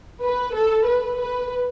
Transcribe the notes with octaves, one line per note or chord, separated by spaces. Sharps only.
B4
A4
B4
B4